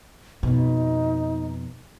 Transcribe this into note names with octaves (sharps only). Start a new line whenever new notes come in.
F2 B2 D#4